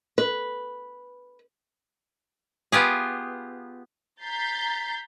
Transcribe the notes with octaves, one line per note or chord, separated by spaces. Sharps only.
B4
B3 F4 G4 G#4
A#5 G6 A6 B6 C7